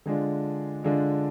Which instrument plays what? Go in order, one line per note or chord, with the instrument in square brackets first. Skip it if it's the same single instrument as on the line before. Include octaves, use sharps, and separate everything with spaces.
[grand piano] D3 G#3 D4 F4
D3 G#3 D4 F4